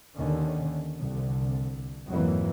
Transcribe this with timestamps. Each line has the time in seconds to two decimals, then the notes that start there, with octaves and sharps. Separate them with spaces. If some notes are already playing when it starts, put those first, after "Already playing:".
0.16 D#2 D3 D#3 C#4
0.95 C2 D3
2.09 F2 G#2 E3 F#3 A#3